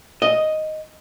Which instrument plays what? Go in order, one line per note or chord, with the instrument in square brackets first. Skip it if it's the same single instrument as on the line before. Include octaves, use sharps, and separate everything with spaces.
[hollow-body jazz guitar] D#5